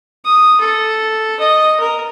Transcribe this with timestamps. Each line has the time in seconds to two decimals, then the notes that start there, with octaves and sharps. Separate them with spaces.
0.25 D#6
0.60 A4
1.40 D#5
1.80 A#4